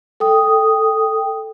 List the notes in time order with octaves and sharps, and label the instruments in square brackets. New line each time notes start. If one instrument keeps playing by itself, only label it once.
[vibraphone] A4 G5 D#6